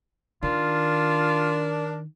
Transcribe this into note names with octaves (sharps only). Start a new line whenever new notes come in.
D#3 D4 F4 A#4